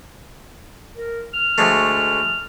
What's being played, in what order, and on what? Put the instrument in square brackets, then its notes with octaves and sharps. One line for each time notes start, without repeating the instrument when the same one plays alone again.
[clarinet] A#4
F6
[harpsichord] D2 G#3 A3